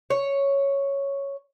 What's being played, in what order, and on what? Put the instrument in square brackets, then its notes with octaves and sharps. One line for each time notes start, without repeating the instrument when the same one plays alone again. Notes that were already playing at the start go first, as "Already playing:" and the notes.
[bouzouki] C#5